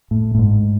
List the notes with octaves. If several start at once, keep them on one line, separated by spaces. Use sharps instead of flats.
A2
A2
G#2